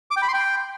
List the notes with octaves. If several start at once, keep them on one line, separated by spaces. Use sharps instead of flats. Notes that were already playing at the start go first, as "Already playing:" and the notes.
D6
G5
B5
C6
G5